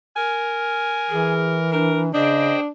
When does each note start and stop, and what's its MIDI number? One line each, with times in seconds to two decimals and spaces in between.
0.16 1.71 70
0.16 1.34 80
1.10 2.13 52
1.10 1.56 68
1.73 2.10 62
1.73 2.01 70
2.13 2.52 49
2.13 2.69 62
2.13 2.60 68
2.13 2.60 72
2.13 2.55 75
2.13 2.60 79